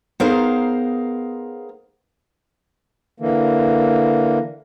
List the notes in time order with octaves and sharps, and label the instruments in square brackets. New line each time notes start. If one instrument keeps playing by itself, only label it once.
[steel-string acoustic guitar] B3 D#4 G#4 A#4 C5 F5
[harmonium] D3 E3 A#3